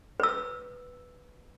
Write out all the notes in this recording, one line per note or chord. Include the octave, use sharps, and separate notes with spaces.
B4 E6